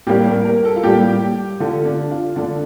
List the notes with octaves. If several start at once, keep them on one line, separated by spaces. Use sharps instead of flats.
A2 G3 A#3 G4
A#4
A#4
A4
F4
A2 G3 A#3 G4
D3 A3 F4
D4
F4
D3 A3 D4